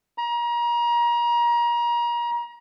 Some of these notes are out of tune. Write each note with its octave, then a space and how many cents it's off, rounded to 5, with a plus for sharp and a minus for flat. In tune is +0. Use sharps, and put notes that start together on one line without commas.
A#5 +30